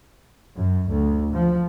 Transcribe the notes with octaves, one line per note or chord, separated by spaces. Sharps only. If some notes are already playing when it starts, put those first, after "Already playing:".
F#2
D2
F3